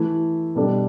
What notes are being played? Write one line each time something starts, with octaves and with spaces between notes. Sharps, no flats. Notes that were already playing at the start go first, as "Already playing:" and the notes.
Already playing: E3 A3 E4 A4
B2 G3 D4 A4